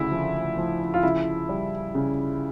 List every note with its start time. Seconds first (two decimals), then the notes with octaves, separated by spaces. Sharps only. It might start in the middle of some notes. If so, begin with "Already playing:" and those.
Already playing: D2 C#3 E4
0.12 F3
0.58 F3
0.94 F4
1.03 C#3 E4
1.49 G3
1.95 C#3